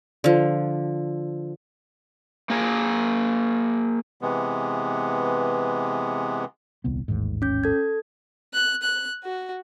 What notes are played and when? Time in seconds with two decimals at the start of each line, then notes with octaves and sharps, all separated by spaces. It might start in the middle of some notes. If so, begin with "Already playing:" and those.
0.24 D3 F3
2.50 A#3 G#4 A#4
4.21 C3 E3 G#3 B3
6.84 D#1 C2 B3
7.08 A1 D#2 G#2
7.42 C#4 G6
7.64 A4 G#6
8.53 F#6
8.82 F#6
9.23 F#4